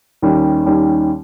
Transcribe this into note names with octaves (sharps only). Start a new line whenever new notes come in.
D#2 D#3 G3 C#4
D#2 D#3 G3 C#4